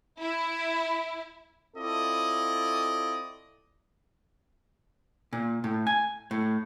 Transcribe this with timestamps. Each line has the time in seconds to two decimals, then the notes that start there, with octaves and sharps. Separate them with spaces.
0.20 E4
1.77 C4 E4 F4 A4 D5 D#5
5.33 A#2
5.64 A2
5.87 G#5
6.31 A2